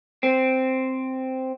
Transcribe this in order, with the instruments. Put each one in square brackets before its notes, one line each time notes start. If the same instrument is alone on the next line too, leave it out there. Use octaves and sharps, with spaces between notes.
[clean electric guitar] C4